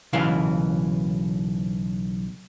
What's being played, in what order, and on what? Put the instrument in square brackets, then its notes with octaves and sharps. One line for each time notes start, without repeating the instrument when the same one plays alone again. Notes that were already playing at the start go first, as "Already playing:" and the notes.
[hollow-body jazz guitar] B1 C#3 E3 F5